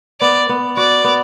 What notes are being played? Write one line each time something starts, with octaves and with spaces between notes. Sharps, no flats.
B3 D5
B3
F#4 D5
B3